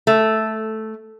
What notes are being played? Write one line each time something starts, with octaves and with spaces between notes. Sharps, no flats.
A3